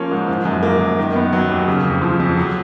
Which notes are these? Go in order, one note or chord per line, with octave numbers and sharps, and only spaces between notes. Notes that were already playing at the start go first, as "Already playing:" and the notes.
Already playing: F3 A#3 C#4
G#2
F3
F#2
A#3
F#2
D#3
B3
F#3
D#2
C#3
F2
F3
F2
F#3